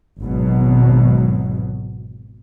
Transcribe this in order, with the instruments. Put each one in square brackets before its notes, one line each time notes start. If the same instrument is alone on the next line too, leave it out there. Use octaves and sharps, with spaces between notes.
[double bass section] G#1 E2 B2 F#3